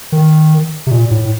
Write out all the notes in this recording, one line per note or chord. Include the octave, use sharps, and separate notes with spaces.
D#3
C3
A#2
A2